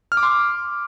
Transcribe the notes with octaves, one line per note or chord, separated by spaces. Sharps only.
F6
D6
C6